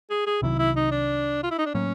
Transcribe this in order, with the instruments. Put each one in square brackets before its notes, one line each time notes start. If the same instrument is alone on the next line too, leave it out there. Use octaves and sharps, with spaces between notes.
[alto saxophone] G#4
G#4
[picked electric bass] C2 C3 D#3 F#3 [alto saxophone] E4
[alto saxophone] E4
D#4
D4
F4
E4
D#4
D4
[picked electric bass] A2 F#3 A#3 [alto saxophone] C#4